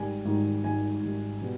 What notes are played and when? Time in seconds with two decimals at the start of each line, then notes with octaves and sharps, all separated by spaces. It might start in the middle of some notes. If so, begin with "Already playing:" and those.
Already playing: G#1 G#2 D#3 G3 G#5
0.25 G#1 G#2 D#3 G3
0.64 G#1 G#2 D#3 G3 G#5
1.02 G#1 G#2 D#3 G3
1.41 B2 G3 B3